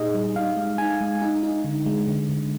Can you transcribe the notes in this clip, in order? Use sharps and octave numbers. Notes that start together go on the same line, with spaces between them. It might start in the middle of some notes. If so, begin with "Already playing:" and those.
Already playing: A#2 A#3 D#4 G4 G#4 D#5
G3
D#4 F5
G#3
D#4 G#5
G#3
D#4
D#4
D3
G#3
D3
D3